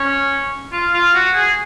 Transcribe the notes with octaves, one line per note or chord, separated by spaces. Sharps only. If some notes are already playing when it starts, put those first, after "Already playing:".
Already playing: C#4
F4
F4
F#4
G#4